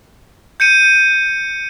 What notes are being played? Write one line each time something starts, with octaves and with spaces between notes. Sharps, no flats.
G6 C#7 D#7